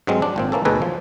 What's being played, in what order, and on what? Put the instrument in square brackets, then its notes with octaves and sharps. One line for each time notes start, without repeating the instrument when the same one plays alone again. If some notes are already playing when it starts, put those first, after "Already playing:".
[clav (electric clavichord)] G2 F#3 G#3 C4
D4
G#1 A#2 C4
E3 A#3 C#4 A4
D2 B2 D#4 G#4 A4 B4
F3